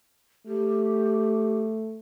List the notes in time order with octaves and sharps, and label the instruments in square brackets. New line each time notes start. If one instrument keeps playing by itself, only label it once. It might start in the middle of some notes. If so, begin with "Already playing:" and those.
[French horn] A3 [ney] G4